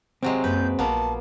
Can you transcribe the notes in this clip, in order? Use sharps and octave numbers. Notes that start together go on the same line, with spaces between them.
C3 F#3 G#3 C4
F#2 A#3 B4 G6
A#1 A#3 B3 A5